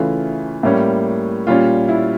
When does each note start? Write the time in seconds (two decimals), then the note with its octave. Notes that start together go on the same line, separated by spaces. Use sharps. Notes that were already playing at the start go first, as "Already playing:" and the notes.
Already playing: C#3 E3 A3 C#4 F4
0.63 A2 G3 A#3 C#4
1.47 A#2 G3 C#4 F4
1.89 E4